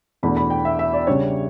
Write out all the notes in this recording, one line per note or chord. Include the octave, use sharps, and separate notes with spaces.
E2 B2 A3 D4 B5
B5
G5
E5
E5
D5
C#3 G3 D4 C#5